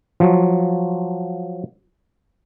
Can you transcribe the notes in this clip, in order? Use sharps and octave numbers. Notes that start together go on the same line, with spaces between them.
F3 F#3